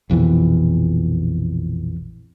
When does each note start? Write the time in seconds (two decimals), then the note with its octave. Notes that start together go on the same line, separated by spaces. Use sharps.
0.10 A#1 F2 B2 E3